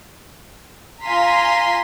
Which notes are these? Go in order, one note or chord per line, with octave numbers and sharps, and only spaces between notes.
F4 F5 G#5 A#5 C6 B6